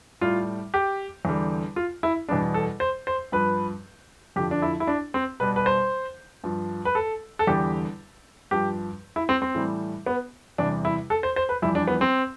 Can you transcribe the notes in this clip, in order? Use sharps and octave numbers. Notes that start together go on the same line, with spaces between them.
A2 G3 F4
G4
E2 D3 G3
F4
E4
E2 B2 G3 D4
A4
C5
C5
G2 F3 B4
F2 D3 F3 G4
D4
E4
E4
D4
C4
B2 G3 B4
B4
C5
G2 F3
B4
A4
A4
E2 D3 G3 G4
G2 F3 G4
E4
C4
C4
A2 E3 G3
B3
E2 C3 G3 D4
E4
A4
C5
C5
B4
F2 E3 G3 E4
D4
B3
C4